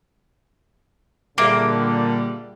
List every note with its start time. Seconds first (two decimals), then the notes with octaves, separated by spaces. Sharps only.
1.38 A#2 D3 G3 A#3 G#4 E5 D6